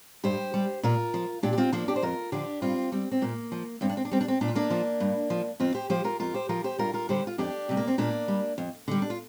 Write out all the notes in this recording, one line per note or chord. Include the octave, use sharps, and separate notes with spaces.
G2 G4 C5
G3
A#2 F4 A#4
F3
A#2 D4 G4
G4
C4 F4
F3 A#3 D4
D4 G4
C5
F2 F4 A#4
D3 F3 D4 G4
G2 C4 F4
G3 C4
C4
A#2 A#3
F3
G2 C4
D4
C4
D4
G3 C4
D4
C4
A#2 D4
F4
A#3 D4
F3
G2
F3
F2 C4 F4
G4 C5
F3 G4 C5
F4 A#4
F2 F4 A#4
G4 C5
F3 F4 A#4
G4 C5
G2 F4 A#4
F4 A#4
D3 G3 G4 C5
F4
F2 D4 G4
C3 G3
A#3
C4
A#2 A#3 D4
G3
F2
D3 G3
D4
F4